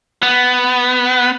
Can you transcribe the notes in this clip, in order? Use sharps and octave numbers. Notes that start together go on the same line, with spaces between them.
B3